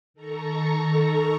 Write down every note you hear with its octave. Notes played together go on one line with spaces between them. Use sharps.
D#3 A4 A#5 C#6